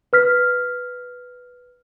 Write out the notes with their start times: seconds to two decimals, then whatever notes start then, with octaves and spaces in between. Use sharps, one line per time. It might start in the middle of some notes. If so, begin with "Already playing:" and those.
0.13 B4 F6 B6